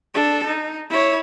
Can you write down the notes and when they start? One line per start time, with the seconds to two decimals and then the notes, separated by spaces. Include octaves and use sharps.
0.14 D4 A4
0.46 D#4
0.90 E4 C#5